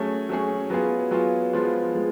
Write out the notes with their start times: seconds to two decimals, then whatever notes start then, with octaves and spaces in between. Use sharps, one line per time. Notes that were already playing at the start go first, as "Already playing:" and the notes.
Already playing: F#3 A3 C#4 G#4
0.29 F#3 A3 C#4 G#4
0.70 F#3 B3 F4 G#4
1.11 F#3 B3 F4 G#4
1.53 F3 G#3 B3 F4
1.95 F3 G#3